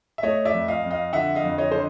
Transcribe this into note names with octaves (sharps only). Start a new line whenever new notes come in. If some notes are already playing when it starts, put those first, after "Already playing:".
E5
A3 C#5 D#5
D5 E5
F2
D#5 F5
F2
D#5 F5
D3 E5 F#5
D#5 F5
F2
C#5 D#5
D3 C5